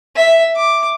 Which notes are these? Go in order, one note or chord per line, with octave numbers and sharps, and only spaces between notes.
E5
D6